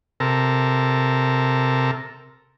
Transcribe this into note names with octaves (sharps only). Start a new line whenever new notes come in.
C3 A4 A#4